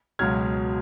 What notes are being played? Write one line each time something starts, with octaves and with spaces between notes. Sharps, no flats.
C#2 B2 F#3 F6 G#6